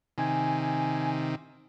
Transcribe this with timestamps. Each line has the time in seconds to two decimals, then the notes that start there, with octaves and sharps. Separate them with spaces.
0.18 C3 D#3 G#5